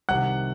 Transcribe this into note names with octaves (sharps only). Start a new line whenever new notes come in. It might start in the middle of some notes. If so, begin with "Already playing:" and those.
C2 C3 D#3 F#5 F#6